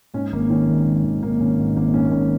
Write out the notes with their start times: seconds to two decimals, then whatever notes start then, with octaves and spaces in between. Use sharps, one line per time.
0.14 G#2 C#4
0.32 G#1 A#3
0.50 D#3 C#4
0.69 G#1
0.86 G#2
1.04 G#1
1.23 D#3 A#3
1.40 G#1 C#4
1.59 G#2
1.76 G#1 A#3
1.94 D#3 C#4
2.06 A#3
2.11 G#1 C#4